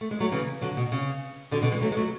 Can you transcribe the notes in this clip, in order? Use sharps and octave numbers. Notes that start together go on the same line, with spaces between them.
A3
G#3
F#3 A3
C#3 E3
D3 F#3
B2
C#3
B2 D3
B2 D3
E3 G#3
F#3 A3
G#3
F#3 A3